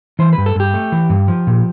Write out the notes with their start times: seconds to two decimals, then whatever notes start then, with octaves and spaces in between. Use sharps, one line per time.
0.19 E3 C5
0.33 B4
0.38 G2
0.46 A4
0.55 G2 G4
0.74 A3
0.92 E3
1.10 G2
1.28 F3
1.47 A#2